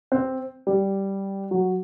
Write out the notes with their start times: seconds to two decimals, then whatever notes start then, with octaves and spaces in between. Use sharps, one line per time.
0.12 C4
0.67 G3
1.51 F#3